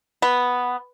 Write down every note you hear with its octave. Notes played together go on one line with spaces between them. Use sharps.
B3